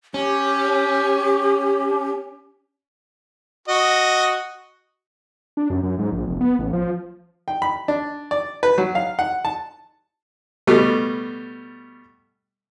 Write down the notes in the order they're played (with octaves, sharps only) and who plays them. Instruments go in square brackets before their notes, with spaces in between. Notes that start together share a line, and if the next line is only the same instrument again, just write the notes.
[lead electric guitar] C#4 [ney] G4
[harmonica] F#4 D#5
[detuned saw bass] D4
F#2
F#2
G#2
A#1
F1
B3
A1
F3
[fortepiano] G5
B5
D4
D5
B4
F#3
F5
F#5
A5
B2 G3 A3